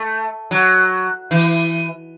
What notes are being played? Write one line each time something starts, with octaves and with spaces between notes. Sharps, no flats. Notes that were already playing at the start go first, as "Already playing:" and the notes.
Already playing: A3
F#3
E3